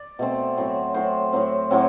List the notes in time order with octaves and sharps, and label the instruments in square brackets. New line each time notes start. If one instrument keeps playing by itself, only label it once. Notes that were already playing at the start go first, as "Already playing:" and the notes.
Already playing: [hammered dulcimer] D5
B2 A3 C4
A2 F#3 C4
A2 F#3 C4 C5
A2 F#3 C4
A2 F#3 C4